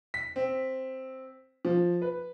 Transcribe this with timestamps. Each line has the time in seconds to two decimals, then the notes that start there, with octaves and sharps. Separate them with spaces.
0.14 B6
0.36 C4
1.65 F3
2.02 B4